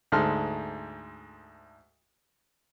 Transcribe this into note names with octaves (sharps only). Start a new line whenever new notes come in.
D2 G#2 A4 C6 F6